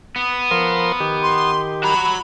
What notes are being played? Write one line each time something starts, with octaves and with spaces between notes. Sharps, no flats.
B3
F3 A#4 C6
D#3 G4
C6
F#4 A#5 B5